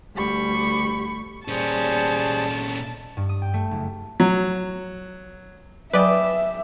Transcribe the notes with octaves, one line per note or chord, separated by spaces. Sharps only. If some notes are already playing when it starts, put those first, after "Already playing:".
D2 G3 B5 C#6
A#2 G3 C#4 G#4 C5 A5
G2
D#6
G5
A3
F#1
F#3
F#3 G#4 B4 D5 E5 G5 D6